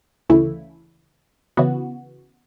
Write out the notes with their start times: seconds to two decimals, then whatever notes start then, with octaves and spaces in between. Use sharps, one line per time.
0.29 D2 C#3 E3 A3 E4
1.57 C#3 E3 B3 F#4